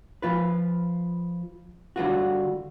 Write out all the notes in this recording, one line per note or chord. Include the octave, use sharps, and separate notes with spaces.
F3 F4 B4
D3 G3 F4 F#4